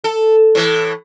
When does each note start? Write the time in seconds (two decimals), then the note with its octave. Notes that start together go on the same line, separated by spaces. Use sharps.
0.04 A4
0.55 A2 E3